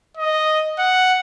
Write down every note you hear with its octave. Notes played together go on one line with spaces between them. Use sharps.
D#5
F#5